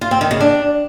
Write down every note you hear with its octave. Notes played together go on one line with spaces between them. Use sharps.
F4
C4
D#3
C#3
D4